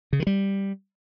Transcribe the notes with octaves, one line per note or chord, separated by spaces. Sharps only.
C#3
D#3
G3